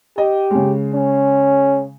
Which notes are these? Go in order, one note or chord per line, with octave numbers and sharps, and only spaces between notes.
G4 D#5
C#3 G#3
C#4